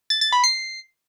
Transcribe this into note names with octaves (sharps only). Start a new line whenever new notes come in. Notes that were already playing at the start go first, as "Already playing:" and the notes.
A6
A6
B5
C7